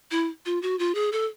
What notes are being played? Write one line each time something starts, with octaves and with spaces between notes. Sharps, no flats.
E4
F4
F#4
F4
G#4
A4